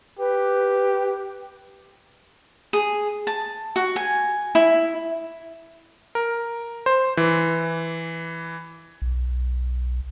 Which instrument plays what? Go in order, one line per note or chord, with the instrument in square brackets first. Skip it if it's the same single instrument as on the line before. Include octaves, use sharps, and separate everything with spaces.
[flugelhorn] G4 [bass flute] B4
[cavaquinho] G#4
A5
F#4
G#5
E4
[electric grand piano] A#4
C5
E3
[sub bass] B1